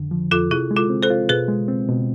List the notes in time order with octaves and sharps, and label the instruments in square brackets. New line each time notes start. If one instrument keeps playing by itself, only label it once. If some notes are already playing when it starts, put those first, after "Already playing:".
Already playing: [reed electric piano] F2 D3
F3
[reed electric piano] F2 [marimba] F4 A4
[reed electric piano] C3 [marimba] E4 G#4
[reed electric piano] G#3
[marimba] F4 A4
[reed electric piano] C4
[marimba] A4 C5
[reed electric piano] F4
[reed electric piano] B2 [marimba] G#4 B4
[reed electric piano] G#3
C4
B2